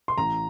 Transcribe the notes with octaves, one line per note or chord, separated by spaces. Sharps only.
C6
A1 A#5